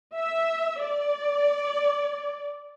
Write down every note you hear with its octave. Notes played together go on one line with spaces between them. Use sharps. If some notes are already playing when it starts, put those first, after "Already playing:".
E5
D5